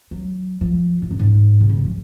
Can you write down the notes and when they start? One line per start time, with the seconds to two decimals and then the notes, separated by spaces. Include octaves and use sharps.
0.11 F#3
0.61 F3
1.02 G#2
1.11 F#2
1.19 G#2
1.60 C3
1.69 C#3
1.76 D#3
1.85 F3